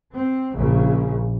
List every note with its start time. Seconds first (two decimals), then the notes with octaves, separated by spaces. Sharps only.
0.14 C4
0.55 A#1 C#3